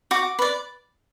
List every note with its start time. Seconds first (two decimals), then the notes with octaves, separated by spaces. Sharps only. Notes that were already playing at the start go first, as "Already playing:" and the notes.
0.11 F#4 D6
0.39 B4 D5